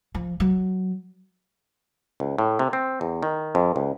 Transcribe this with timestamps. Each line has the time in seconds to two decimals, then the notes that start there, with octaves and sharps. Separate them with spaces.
0.15 F3
0.40 F#3
2.20 C#2
2.38 A2
2.59 C3
2.73 C4
3.01 E2
3.23 D#3
3.55 F2
3.76 C#2